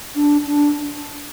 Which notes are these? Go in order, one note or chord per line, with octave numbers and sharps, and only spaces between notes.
D4
D4